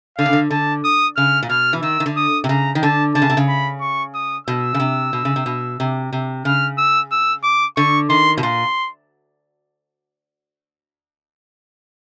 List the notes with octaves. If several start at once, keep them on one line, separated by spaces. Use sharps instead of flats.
D3 F5
C#3
D3
D3 A5
D#6
C#3 F6
A#2
B2 F6
E3
D#3 E6
D#3
D3
D#6
C3
C#3 A#5
D#3
D3 A5
D3 A5
C#3
C3
C#3
B5
C#6
D#6
B2 E6
C#3
C3
B2
C#3
C3
B2
C3
C3
C#3 F6
E6
E6
D6
D3 C#6
D#3 C6
B2
A#2 C6